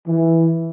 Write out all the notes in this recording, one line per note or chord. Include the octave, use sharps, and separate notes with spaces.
E3